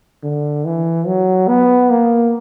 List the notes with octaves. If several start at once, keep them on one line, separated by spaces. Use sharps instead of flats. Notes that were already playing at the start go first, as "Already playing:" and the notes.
D3
E3
F#3
B3
A#3